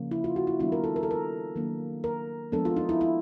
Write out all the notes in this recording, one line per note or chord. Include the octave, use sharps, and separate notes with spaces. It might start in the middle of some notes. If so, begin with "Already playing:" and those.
Already playing: C#3 F3 A#3 C#4
E4
F4
F#4
E4
D#3 G3 B3 D4 E4
A#4
A4
A#4
A4
A#4
D#3 F#3 A#3 D4
A#4
F3 G#3 B3 D4 A4
F4
D#4
E4
E4